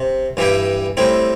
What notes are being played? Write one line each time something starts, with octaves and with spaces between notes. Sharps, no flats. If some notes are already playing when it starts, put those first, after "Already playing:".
Already playing: C3
G2 E3 G3 E4 G4
A2 G3 C4 E4